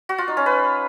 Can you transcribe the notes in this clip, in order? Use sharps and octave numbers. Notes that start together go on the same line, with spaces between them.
F#4
F4
D#4
C#4
B4